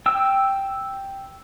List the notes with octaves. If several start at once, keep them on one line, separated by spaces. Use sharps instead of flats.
G5 E6